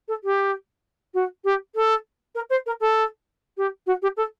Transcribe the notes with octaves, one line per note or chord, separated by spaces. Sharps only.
A4
G4
F#4
G4
A4
A#4
C5
A#4
A4
G4
F#4
G4
A4